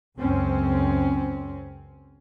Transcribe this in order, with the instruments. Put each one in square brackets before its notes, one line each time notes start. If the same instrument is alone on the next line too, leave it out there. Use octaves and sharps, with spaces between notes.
[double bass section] C#2 F#2 C4 C#4